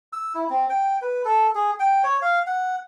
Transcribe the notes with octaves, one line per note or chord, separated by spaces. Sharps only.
E6
E4
C4
G5
B4
A4
G#4
G5
C#5
F5
F#5